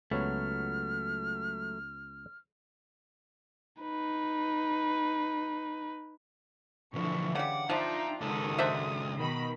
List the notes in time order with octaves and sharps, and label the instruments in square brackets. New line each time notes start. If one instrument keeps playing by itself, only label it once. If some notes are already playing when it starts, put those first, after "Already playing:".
[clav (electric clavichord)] C#2 B3 C#5 [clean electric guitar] F#3 A3 [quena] F6
[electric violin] D#4 B4
[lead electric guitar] B1 F3 [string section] D3 E3 [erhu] C#6
[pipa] C#3 G3 [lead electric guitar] F#5 [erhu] D6
[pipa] F3 D4 [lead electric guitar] D#4 [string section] F4 G5 A#5 [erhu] E5
[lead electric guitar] C#2 A4 [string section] G#2 D#3 G#3 [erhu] D#6
[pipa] D4 C5 E5
[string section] B2 D#3 B5